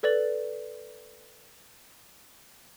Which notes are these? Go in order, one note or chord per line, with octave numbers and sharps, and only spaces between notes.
A4 B4 D5 A6 F#7